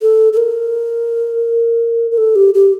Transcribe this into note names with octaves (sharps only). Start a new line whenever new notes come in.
A4
A4
A#4
A#4
A4
G4
G4